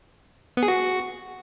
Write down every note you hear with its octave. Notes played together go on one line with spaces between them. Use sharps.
B3
G#4
F#4